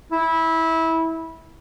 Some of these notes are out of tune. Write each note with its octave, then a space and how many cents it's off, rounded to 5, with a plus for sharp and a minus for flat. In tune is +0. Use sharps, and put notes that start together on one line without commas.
E4 -20